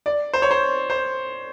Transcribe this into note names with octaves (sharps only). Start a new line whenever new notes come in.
D5
C5
C#5
C5
C5